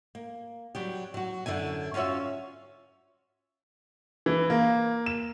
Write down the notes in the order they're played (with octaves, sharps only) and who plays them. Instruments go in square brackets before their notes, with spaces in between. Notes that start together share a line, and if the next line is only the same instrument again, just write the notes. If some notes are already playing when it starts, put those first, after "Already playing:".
[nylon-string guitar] A#3
F#3 G3 G4
F#3 F#4
F#2 D3 E4 G#5
C#4 F4 F#4 C#5 E5
[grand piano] E3
A#3
E7